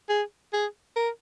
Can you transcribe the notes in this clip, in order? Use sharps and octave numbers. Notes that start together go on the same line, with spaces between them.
G#4
G#4
A#4